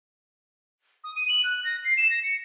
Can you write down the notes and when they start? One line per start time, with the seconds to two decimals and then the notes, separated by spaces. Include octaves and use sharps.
1.04 D#6
1.16 D#7
1.29 F#7
1.44 F#6
1.64 A#6
1.85 C7
1.97 E7
2.10 A#6
2.23 C#7